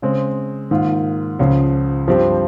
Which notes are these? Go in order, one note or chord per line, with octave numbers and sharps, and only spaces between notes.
C#3 G#3 C4
G#2 D#3 A#3 F4
C#2 C#3 F3
G2 F3 C4 G4